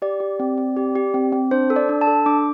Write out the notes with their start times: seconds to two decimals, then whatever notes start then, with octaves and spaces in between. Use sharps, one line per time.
0.02 G4 D5
0.20 G4
0.39 C4
0.58 C4
0.77 G4
0.95 G4
1.14 C4
1.32 C4
1.51 D4 C5
1.70 A4
1.76 D5
1.89 D4
2.01 A5
2.07 A4
2.26 D4 D6